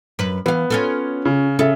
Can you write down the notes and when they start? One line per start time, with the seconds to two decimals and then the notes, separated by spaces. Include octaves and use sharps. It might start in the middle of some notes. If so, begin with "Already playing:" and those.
0.19 F#2 B4
0.46 E3 B3 F5
0.70 C#4 F4 A4
1.25 C#3
1.59 C#3 A4 E5